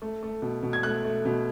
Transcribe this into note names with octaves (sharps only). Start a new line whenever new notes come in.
A3
A3
B2
B2
G#6
A3 F#6
A3
B2